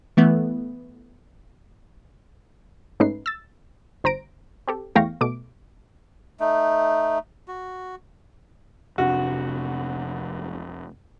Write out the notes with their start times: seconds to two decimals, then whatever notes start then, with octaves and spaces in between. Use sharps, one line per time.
0.17 E3 A3 B3
3.00 G#2 A3 C#4 D#4 B4 C7
3.26 E6 A6
4.04 G1 C5 A#5 A#6 D7
4.68 C4 G4 A4
4.95 E2 A3 F5 G5 C#6 A#6
5.21 B2 A3 D6 D7
6.40 A3 D#4
7.48 F#4
8.98 F1 C3 D4 F#4